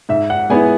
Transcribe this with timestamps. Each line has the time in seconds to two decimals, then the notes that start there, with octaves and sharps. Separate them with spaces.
0.09 G#2 E5
0.30 F#5
0.50 G#3 B3 E4 G#5